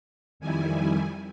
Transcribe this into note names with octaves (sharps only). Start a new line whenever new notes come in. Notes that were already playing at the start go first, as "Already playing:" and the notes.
F2 D#3 G3 E4 G#5